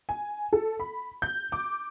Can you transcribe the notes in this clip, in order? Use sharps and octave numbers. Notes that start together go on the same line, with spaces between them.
G#5
A4
B5
G6
D6